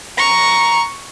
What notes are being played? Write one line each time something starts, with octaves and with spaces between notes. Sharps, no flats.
A#5 C#6